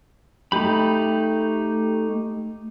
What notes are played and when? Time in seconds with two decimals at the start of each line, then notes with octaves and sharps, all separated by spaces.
0.52 A3 D#4 G4 B5